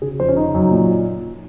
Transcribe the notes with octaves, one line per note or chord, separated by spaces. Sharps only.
C#3 G#4
F2 C5
C#4
C#3 D#4
F#2
A#2